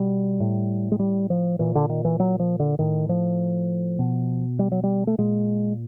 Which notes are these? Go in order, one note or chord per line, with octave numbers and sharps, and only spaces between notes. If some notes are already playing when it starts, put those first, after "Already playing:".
Already playing: B2 G3
A2
G#3
G3
F3
A#2 E3
D3
D#3
E3
F#3
F3
D3
A2 D#3
F3
B2
G3
F#3
G3
A3
A#2 G#3